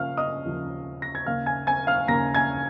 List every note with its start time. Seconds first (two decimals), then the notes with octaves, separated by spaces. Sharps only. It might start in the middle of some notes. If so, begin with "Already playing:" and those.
Already playing: C#3 F3 A#3 F5 F6
0.17 D#5 D#6
0.46 D#2 C#3 F3 A#3
1.02 A#6
1.15 G#6
1.26 D#2 C#3 A#3 F5 F6
1.46 G#5 G#6
1.67 G#5 G#6
1.87 F5 F6
2.08 D#2 C#3 A#3 A#5 A#6
2.35 G#5 G#6